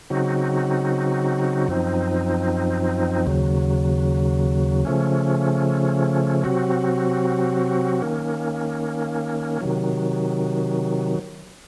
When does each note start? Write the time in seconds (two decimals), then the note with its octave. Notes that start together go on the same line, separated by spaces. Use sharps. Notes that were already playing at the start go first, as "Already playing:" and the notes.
0.10 C#3 F#3 C4 D#4 F#4
1.68 F#2 F3 C4 D#4
3.27 D#2 C#3 F#3
4.85 C#3 F3 A3 C#4
6.44 C3 F#3 C4 F#4
8.02 D#3 A#3 C#4
9.61 C3 D#3 F#3